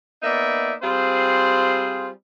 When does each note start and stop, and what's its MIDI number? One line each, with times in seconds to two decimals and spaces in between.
0.23 0.74 58
0.23 0.74 59
0.23 0.74 63
0.23 0.74 74
0.23 0.74 76
0.82 2.10 55
0.82 2.10 60
0.82 2.10 65
0.82 2.10 68
0.82 2.10 72